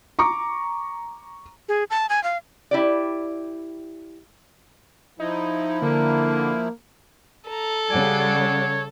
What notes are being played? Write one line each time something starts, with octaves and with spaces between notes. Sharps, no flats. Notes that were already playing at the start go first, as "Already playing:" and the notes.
A#5 C#6 D6
G#4
A5
G#5
F5
E4 G4 D5
F3 D#4 E4
D3 A#3
A4 A#5
C#3 G3 D5 F#5 G#5
C#5